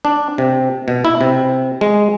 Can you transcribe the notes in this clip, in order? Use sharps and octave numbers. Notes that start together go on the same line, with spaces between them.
D4
C3
B2
E4
C3
G#3